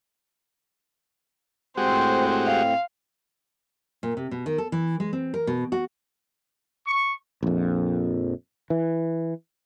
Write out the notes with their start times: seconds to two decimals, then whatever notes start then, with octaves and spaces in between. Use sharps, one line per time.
1.77 A2 G#3 C4 F#4 G4 C5
2.47 F5
4.03 A#2
4.17 C3
4.31 B2
4.46 D#3
4.58 A4
4.72 E3
5.00 G#3
5.13 C4
5.34 A#4
5.47 B2
5.72 F#4
6.86 C#6
7.43 A#1 F2
8.70 E3